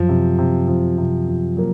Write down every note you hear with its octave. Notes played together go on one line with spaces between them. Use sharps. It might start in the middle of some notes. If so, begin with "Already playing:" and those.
Already playing: F#2 F3 F#3
C3
C3
F3
C3
F3
F#3 A#3